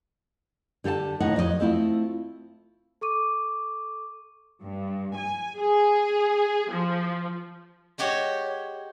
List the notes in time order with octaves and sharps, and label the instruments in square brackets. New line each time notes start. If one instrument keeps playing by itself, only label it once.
[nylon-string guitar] D3 G4 A4 F5 A5
D#2 A2 D#4 E5 F#5
F2 F#3 A#4 D#5
A3 C4 E4 F4
[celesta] A4 C#6 D6 D#7
[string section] G2
G#5
G#4
F3
[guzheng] G#3 F#4 G4 C#5